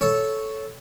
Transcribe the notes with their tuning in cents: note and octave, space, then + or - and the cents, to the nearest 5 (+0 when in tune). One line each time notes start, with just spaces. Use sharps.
A4 -10 C#5 +0